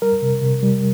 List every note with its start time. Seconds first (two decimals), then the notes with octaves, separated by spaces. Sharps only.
0.02 G3 A#4
0.22 C3
0.42 C3
0.62 G3